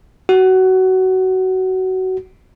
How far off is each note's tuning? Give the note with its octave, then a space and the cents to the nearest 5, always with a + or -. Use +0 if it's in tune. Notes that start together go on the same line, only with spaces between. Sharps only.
F#4 +20